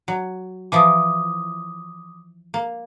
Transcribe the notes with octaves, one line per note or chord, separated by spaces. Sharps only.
F#3
E3 F3 E4 D6 D#6
A#3